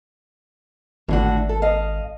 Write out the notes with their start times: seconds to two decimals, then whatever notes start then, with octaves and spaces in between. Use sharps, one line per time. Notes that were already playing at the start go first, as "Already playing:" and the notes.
1.08 G#1 A2 D3 F#4
1.49 A4
1.62 D#5 F5